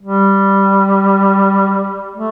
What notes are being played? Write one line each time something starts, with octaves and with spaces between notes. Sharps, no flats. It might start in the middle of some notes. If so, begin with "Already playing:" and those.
G3
A3